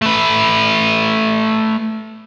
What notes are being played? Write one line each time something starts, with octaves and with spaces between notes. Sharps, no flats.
A3 B4